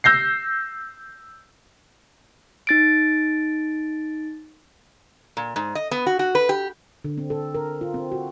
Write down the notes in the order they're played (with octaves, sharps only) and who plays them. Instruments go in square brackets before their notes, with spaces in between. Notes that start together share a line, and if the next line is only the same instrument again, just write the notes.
[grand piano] E6 G6 A#6 C7
[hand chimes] D#4 A6 D7
[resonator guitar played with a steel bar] A#2
G#2
D#5
B3
F#4
F#4
B4
G4
[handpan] D3
C4
A4
A#4
F4
C4
F#4